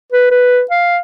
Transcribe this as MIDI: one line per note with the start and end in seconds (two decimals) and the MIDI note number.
0.12 0.31 71
0.31 0.62 71
0.71 0.99 77